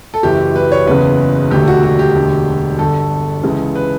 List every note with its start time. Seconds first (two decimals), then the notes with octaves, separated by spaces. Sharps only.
0.14 A4
0.23 F#1 F#2 E3 G4
0.56 B4
0.72 C#5
0.87 F#1 E2 C#3 B4
1.50 E1 D2 D3 G4
1.68 F#4
1.83 F#4
1.99 G4
2.14 E1 D2 D3
2.78 G1 G2 D3 A4
3.43 C#2 C#3 E3
3.75 B4